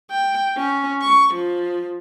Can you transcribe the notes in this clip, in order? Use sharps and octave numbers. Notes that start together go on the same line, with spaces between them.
G5
C#4
C#6
F3